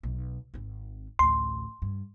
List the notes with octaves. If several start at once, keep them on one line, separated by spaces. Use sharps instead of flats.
B1
G#1 C4
A1 D2 C6
G2